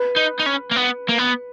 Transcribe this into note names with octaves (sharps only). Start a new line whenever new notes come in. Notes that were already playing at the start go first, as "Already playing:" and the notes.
Already playing: B4
D#4
D#4
C#4
A#3
B3
A#3
B3